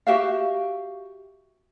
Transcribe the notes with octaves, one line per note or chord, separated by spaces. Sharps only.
F#4 G4 E5 F5